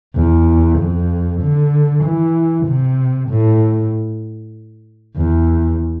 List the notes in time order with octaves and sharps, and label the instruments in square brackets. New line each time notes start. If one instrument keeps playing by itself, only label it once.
[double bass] E2
F2
D3
E3
C3
A2
E2